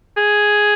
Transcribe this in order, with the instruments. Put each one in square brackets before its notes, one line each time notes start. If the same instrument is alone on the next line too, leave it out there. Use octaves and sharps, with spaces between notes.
[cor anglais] G#4